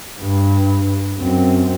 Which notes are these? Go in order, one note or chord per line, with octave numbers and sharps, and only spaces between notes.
G2
F#2 C4